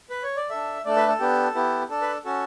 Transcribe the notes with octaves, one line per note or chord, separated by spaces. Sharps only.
B4
C#5
D5
D4 A4 E5
A3 D4 A4 D5
B4
A4
B3 D4 G4
B3 E4 G4
D4 A4
B4
C#4 F#4 A4